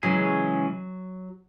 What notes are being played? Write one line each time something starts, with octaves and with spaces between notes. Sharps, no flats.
C#3 E3 F#3 G#3 C#4 G#4